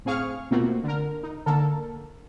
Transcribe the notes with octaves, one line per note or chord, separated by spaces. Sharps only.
A2 C4 G#4 F5 C#6 F6
B2 A3 A#3 C4 F4 F#4
D3 A#4
D#4
D3 A#3 A4 A#4